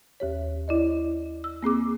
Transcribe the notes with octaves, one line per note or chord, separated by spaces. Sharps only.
D#2 G4 C#5
E4 D5 D#5
E6
A#3 C4 G#4 D6